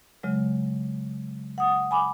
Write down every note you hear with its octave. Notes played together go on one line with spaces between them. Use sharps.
C#3 F#3 G#3
F#5 D#6
G#5 B5 D6